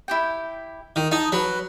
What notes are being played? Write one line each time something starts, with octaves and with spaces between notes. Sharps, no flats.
E4 G4 G5
D#3
D#4 A5 D#6
F#3 B4